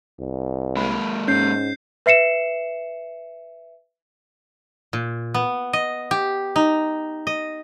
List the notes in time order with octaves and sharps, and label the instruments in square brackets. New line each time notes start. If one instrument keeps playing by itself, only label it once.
[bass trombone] C2
[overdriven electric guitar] G#3 A#3 [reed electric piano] B5
[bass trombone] G#2 [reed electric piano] C#4 [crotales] G6 C7
[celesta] B4 E5 C7 C#7 E7
[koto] A#2
B3
D#5
G4
D#4
D#5